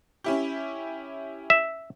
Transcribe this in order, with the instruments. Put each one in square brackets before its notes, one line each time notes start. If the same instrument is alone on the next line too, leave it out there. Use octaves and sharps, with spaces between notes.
[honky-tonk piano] C#4 E4 G4
[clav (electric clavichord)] E5